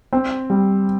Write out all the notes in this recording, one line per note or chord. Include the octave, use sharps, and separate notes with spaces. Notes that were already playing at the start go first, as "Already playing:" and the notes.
C4
G3